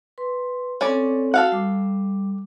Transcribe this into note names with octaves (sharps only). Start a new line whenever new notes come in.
B4 C6
C4 C#4 A4 D5
F#4 A4 F5 F#5
G3 D6